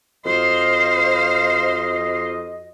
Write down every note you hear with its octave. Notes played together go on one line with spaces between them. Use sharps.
F2 F#4 C5 D#5 F5